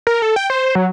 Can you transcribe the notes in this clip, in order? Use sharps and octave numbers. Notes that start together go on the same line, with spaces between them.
A#4
A4
G5
C5
F#3